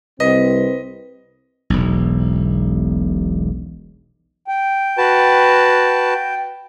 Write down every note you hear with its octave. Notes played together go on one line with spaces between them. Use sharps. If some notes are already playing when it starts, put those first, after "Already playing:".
C2 C4 B4 D#5
E1 B1
G5
F#4 B4 A5